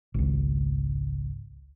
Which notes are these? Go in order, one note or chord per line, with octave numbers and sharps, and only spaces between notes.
G#1 C#2